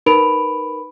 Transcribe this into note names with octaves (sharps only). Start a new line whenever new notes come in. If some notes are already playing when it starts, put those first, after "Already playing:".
D#4 A#4 B4 B5 D7 F7